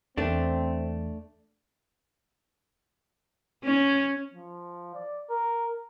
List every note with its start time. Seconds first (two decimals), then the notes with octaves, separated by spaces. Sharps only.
0.18 E2 A3 C4 D4
3.64 C#4
4.34 F3
4.94 D5
5.30 A#4